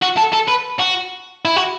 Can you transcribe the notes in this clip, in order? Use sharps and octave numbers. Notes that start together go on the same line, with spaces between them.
F#4
A4
A4
B4
F#4
E4
F#4